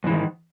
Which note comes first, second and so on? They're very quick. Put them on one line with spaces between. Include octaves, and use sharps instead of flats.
F2 E3 G#2 D#3